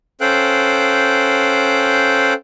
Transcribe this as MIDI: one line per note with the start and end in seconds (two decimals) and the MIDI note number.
0.21 2.33 61
0.21 2.33 69
0.21 2.33 72
0.21 2.33 77
0.21 2.33 79
0.21 2.33 90